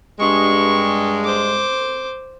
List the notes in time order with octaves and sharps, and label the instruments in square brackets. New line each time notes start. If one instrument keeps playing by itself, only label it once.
[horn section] G2 G#3 [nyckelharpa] C#6
[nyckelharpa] C5 D6